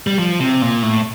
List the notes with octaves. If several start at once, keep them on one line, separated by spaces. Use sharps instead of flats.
G3
F3
C3
A#2
A2